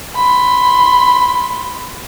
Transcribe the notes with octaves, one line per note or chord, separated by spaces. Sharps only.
B5 C6